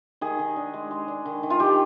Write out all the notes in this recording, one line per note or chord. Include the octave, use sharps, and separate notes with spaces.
D#3 G#4
D#3
D4
G#3
G#3
D4
D#3
D#3
F4
D#3 G4